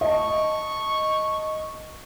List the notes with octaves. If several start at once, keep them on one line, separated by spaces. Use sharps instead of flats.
D#5 A5 C#6